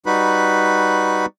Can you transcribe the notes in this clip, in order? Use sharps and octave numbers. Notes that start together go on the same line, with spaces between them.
G3 D#4 F#4 B4 B5